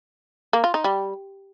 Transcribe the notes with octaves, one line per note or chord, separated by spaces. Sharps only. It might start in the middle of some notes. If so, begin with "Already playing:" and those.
A#3
F4
D#4
G3